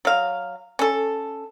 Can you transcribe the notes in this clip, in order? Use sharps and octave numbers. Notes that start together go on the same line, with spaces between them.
F#3 F5
C#4 A4